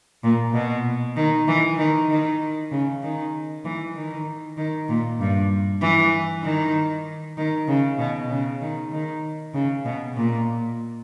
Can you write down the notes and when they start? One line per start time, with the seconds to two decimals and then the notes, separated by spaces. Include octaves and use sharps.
0.23 A#2
0.54 B2
1.16 D#3
1.48 E3
1.78 D#3
2.09 D#3
2.71 C#3
3.02 D#3
3.65 E3
3.96 D#3
4.57 D#3
4.89 A#2
5.20 G2
5.82 E3
6.43 D#3
7.38 D#3
7.68 C#3
7.99 B2
8.30 C#3
8.61 D#3
8.92 D#3
9.54 C#3
9.85 B2
10.16 A#2